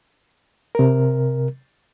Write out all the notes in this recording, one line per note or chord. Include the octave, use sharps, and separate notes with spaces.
C3 A#4